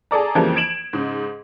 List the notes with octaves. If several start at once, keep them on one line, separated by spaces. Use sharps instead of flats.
G#4 A4 D5 A#5
F2 C#3 E3 F3 G3 A#3
G#6 D7 E7 F#7
G#2 C#3